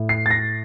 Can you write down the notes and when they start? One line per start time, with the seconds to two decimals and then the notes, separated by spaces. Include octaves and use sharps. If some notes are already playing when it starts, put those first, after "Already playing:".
Already playing: A2
0.09 C7
0.26 A6
0.31 A#6